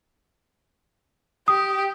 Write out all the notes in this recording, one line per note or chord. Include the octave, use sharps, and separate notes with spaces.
G4 D#6